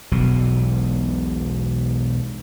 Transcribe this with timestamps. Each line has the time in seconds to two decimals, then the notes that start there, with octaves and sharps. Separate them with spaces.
0.11 E1 B1 B2